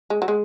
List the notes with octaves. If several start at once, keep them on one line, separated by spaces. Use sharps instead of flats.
G#3
F#3
G#3